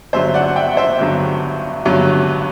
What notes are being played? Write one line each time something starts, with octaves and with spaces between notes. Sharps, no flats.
G1 G2 F#3 C5 E5
D5 F#5
E5 G5
C5 E5
G1 G2 F#3
G1 G2 F#3